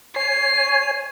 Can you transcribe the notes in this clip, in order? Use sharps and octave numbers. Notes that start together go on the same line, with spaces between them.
C#5 G#5 C7